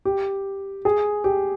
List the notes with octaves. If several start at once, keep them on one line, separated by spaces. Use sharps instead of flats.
G4
G#4
G4